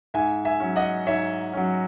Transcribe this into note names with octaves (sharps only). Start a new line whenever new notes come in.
G#2 E5 G#5
E5 G#5
F#3 C#4
D#5 F#5
G#2 C#5 E5
F#3 C#4